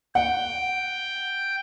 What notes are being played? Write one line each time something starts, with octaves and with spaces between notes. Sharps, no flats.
F#5 G5